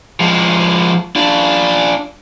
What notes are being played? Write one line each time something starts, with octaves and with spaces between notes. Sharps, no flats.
F3 G#3
D4 F4